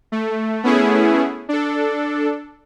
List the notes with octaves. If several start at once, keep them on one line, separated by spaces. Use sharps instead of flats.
A3
A3 B3 C#4 E4 G#4
D4 A4